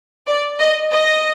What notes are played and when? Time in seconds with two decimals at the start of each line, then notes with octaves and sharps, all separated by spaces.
0.27 D5
0.60 D#5
0.93 D#5